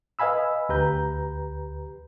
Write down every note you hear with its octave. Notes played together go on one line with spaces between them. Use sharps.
B4 D#5 F5 G#5 B5 E6
D2 G4 B4 A#5 G6